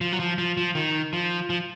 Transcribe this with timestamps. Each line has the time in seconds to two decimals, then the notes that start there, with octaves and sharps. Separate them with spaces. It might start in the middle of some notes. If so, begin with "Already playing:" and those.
0.01 F3
0.13 F#3
0.20 F3
0.38 F3
0.57 F3
0.75 D#3
1.13 F3
1.50 F3